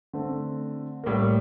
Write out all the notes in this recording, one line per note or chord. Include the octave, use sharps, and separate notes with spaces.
D3 A3 C4
A2 G3 A#3